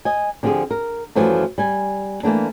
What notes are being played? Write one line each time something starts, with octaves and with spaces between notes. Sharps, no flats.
D#5 G#5
D3 F3 C4 G4 G#4
A#4
F#2 E3 F3 G3 A3
G3 G#5
E3 A3 A#3 D4